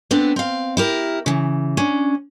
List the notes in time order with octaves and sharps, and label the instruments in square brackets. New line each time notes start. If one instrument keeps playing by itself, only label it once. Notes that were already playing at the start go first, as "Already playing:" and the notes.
[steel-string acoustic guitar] B3 C4 D4 A4
C4 F5
E4 G4 A#4
C#3 E3
C#4 D4